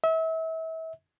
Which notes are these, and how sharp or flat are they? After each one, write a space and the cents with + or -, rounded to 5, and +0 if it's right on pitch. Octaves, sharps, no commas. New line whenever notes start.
E5 -35